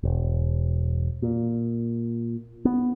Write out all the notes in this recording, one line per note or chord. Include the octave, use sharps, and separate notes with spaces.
E1
A#2
B3